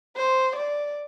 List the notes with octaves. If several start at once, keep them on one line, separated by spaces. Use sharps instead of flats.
C5
D5